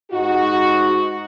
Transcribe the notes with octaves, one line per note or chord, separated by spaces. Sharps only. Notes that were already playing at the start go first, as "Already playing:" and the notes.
G#2 D#4 F#4